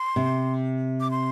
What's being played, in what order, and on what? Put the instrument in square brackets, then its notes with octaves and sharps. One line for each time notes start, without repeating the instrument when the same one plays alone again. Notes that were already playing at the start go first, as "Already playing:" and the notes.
Already playing: [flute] C6
[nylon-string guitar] C3
[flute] D6
C6